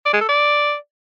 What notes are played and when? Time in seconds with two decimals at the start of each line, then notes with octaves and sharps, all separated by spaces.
0.06 D5
0.13 G#3
0.21 A4
0.28 D5